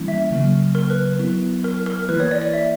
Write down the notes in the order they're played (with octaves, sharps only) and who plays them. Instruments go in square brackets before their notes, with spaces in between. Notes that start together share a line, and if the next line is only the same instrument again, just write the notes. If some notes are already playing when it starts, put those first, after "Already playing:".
Already playing: [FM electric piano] E3 G3 A#3 C#4 E4
[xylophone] E5
[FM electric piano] C#3 F#3 A#3
[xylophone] A#4
B4
B4
[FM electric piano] F#3 B3 E4
[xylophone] A#4
A#4
[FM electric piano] E3 A#3 E4 [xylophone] B4
[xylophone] C#5
D5
D5
E5